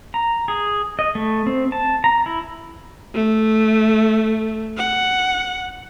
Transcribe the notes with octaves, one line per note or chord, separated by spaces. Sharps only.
A#5
G#4
D#5
A3
C4
A5
A#5
E4
A3
F#5